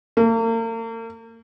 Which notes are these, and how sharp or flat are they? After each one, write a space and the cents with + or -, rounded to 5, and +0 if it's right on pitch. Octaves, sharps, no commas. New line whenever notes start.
A#3 -45